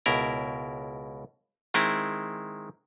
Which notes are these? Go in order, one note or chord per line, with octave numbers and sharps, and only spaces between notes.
C#2 B2 E4 A#4
D#3 G#3 C4 E4